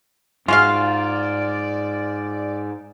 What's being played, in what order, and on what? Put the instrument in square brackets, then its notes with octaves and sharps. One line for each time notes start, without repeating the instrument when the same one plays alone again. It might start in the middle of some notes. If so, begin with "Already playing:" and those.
[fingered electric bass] G#2 [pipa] G#3 F#4 F5 [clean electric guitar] F4 [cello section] D5